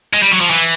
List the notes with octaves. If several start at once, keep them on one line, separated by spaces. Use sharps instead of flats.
G#3
G3
F#3
F3
E3